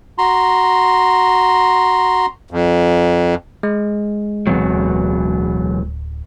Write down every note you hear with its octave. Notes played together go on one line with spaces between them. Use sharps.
F#4 A#5 C6
F2
G#3
D1 E2 B2 F#3 C4